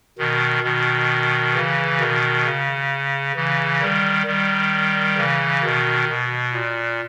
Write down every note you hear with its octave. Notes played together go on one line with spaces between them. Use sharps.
B2 D#3
B2 D#3
C#3 E3
B2 D#3
C#3
C#3 E3
D#3 G3
D#3 G3
C#3 E3
B2 D#3
B2
A#2